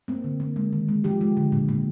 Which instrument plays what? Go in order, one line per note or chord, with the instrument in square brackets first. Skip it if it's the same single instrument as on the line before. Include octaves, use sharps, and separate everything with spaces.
[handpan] A#3 C4
D3
A#3
G#3
D#3
G#3
F3 G4
G#3
D3
A#2
A#2